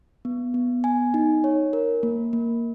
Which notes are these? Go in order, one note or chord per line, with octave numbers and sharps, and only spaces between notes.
B3
B3
G#5
D#4
C#5
A#4
A#3
A#3